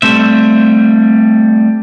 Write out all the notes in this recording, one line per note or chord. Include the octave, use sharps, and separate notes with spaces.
G3 A3 C4 E5